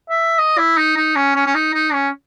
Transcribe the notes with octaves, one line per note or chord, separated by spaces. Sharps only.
E5
D#5
E4
D#4
D#4
C#4
C#4
C#4
D#4
D#4
C#4